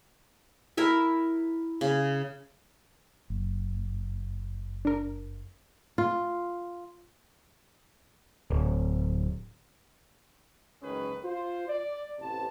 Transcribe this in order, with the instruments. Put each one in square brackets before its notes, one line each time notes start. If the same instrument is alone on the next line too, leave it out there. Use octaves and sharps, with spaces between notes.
[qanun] E4 A#4 E5
C#3
[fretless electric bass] F#1
[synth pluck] D4 A#4
[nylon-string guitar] F4
[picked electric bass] D1
[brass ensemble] F#1 C#2 D#3 C#4 G#4 B4
F4 C5
D5
A1 C3 A5